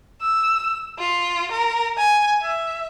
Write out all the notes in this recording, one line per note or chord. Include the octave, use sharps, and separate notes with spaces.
E6
F4
A#4
G#5
E5